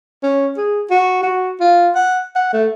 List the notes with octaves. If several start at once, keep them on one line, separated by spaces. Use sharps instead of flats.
C#4
G#4
F#4
F#4
F4
F#5
F#5
A3